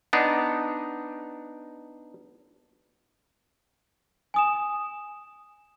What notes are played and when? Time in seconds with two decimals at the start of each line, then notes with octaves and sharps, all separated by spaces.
0.13 B3 D4 D#4
4.34 G#5 D#6 E7